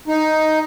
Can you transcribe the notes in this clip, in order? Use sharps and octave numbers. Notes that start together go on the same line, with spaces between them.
D#4